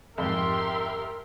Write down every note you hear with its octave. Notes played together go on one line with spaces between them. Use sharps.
F2 G#2 G4 A#4 E5 C6